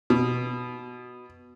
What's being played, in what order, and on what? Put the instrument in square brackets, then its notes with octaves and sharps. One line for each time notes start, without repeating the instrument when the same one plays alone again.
[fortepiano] B2